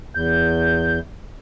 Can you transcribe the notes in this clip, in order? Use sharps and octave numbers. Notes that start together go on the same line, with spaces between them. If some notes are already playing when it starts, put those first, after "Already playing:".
E2 G6